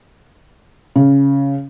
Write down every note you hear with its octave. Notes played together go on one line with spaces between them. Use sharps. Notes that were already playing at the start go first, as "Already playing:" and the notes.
C#3